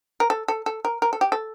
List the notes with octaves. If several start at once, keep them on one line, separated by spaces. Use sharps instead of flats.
A#4
A4
A4
A4
A#4
A#4
A4
G4
A4